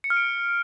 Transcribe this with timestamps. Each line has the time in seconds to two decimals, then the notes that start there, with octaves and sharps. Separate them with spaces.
0.04 C#7
0.10 F6
0.17 D7